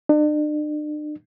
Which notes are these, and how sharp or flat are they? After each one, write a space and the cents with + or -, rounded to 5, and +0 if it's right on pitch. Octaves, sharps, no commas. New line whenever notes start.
D4 +45